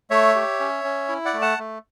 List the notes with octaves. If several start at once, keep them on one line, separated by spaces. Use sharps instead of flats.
A3 C#5 E5
G4
C#4
C#4
E4
D5 F#5
A3
F#5 A5
A3